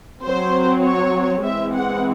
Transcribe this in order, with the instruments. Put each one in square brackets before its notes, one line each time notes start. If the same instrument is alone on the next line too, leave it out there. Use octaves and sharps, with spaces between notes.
[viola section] F#3 C4 C5
C#5
E3 G#3 C4 E5
F#5